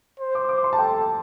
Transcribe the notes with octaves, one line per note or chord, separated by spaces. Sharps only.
C5
D6
D6
C6
A5
A4 G5